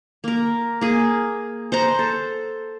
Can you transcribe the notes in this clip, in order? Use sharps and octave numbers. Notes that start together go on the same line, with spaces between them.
A#3 A#4
A#3 G#4
C5 F#5 A#5
A4